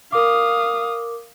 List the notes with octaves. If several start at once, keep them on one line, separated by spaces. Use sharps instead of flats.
A#4 F5 D6 D#6